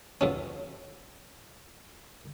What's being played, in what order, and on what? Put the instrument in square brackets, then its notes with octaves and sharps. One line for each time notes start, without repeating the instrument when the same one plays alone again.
[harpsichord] F2 B2 C#4